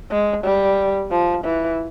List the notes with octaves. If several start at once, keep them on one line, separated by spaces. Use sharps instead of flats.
G#3
G3
F3
E3